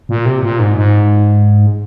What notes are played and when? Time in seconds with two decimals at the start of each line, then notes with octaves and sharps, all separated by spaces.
0.09 A#2
0.25 C3
0.43 A#2
0.59 G#2
0.76 G#2